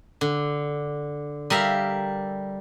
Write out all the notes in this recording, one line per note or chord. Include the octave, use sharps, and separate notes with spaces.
D3
G3 A#4 E5 F5